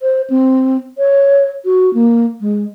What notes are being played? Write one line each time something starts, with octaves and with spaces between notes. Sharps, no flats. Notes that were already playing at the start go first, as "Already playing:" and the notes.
C5
C4
C#5
F#4
A#3
G#3